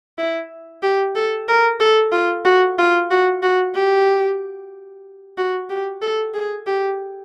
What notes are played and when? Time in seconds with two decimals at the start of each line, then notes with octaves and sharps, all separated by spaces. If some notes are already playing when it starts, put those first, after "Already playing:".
0.18 E4
0.83 G4
1.16 A4
1.48 A#4
1.80 A4
2.12 F4
2.45 F#4
2.78 F4
3.11 F#4
3.43 F#4
3.75 G4
5.38 F#4
5.70 G4
6.02 A4
6.34 G#4
6.67 G4